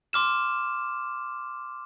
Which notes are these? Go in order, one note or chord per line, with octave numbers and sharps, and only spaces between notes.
C6 D6 F6 E7